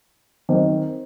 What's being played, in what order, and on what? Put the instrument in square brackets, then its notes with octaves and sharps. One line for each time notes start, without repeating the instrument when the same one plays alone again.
[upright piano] D#3 C4